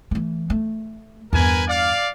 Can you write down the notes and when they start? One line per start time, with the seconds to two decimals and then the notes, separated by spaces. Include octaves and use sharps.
0.11 E3 A3
0.50 A3
1.33 E2 G2 A#4 B4 G#5
1.68 D5 F5